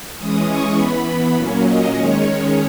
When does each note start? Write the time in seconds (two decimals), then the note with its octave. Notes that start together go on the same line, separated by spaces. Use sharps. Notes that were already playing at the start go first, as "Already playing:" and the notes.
0.18 E3 G#3 C#4 D#6
0.48 C#6
0.77 E3 B3 B5
1.36 A#2 F#3 A#3 C#4
1.66 D#5
1.95 D#3 G#3 C#4 C#5